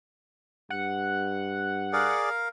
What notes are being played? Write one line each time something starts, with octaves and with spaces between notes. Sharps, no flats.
G2 F#5
G#4 A#4 D5 F5